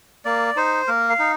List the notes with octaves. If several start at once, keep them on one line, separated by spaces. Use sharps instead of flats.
A#3 D5
D#4 C5
A#3 A#4
F5
D#4